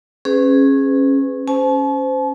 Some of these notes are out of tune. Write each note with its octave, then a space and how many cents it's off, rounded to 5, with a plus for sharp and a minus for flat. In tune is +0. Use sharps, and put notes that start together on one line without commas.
C#4 -25 G#4 +0 B4 +35
C#4 +0 C5 -20 A5 -45